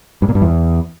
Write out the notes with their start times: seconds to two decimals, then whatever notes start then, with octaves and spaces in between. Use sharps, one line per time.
0.22 G2
0.29 A#2
0.35 G2
0.42 E2